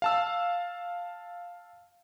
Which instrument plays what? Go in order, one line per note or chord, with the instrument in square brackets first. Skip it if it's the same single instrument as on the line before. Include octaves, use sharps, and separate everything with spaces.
[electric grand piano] F5 A5 E6